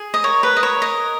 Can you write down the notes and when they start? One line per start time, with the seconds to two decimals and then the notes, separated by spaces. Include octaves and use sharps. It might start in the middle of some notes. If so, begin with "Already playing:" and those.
Already playing: G#4
0.14 D#5
0.23 A#4 C#5
0.43 B4
0.57 D#5
0.63 C#5
0.82 D#5